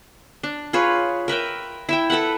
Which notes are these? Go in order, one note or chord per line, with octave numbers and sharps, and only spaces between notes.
D4
F4 G#4 B4 C#5
A#4 B4 E5 G5
E4 E5 G5
A4 B4 E5 F#5